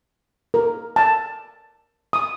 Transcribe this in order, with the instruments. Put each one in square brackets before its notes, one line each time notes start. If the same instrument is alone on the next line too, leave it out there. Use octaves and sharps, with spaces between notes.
[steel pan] A#4
A5
D#6